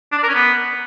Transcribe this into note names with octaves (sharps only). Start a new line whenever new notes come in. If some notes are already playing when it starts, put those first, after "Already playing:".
D4
D5
A#4
C#4
B3